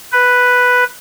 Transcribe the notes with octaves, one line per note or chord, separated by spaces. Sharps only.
B4